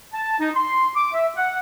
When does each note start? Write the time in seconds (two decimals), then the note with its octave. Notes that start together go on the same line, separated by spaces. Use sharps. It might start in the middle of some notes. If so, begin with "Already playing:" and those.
0.14 A5
0.40 D#4
0.55 C6
0.95 D6
1.13 E5
1.36 F#5